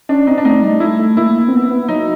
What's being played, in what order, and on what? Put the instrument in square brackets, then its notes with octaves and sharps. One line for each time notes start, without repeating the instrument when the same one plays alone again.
[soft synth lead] C#4 [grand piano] D4
[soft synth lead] C4 [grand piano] D#4
[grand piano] D4
[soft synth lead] A3 [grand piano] D#4
[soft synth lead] G3
[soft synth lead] A3 [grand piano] E4
[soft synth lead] A3
[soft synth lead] A#3 [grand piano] E4
[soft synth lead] C4
B3
B3
[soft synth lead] F#3 [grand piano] D#4